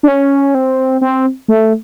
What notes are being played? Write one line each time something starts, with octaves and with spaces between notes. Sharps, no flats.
D4
C#4
C4
C4
A3